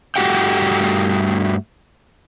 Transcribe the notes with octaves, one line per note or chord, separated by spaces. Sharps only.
G2 A3 F#4 G4 F#5 G5